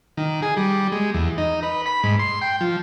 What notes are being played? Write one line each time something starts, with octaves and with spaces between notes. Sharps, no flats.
D#3
G#4
G3
G#3
E2
D#4
B4
B5
G#2
C6
G5
F3